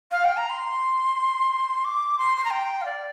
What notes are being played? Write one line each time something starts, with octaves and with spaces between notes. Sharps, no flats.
F5
G5
A#5
C6
D6
C6
C6
A#5
G5
F5
D5